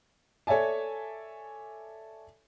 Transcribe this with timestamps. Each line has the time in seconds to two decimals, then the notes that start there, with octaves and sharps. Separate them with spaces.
0.47 A4 C#5 D5 E5 G#5 A5